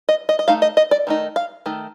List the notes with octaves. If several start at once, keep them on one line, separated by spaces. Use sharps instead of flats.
D#5
D#5
D#5
A3 D#4 F5
D#5
D#5
D5
D#3 A3 D#4
F5
D#3 A3